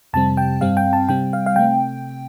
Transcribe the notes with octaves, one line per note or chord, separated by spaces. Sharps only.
F2 C3 G3 C4 A5
G5
G2 G3 C4 F5
G5
A5
C3 G3 C4 G5
F5
F5
C3 A3 C4 G5